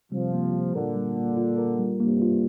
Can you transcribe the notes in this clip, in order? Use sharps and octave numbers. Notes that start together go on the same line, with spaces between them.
C3 F3 G3
A#3
F4
A#2 D3 A#4
G3
A#3
F4
A#4
G3
G2 C3 A#3
F4